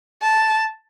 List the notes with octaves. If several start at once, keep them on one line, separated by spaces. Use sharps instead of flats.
A5